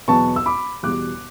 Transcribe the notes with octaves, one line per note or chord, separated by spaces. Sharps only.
E2 B2 F#3 B3 A5 C#6
E6
B5 D6
E2 B2 G3 D6 F#6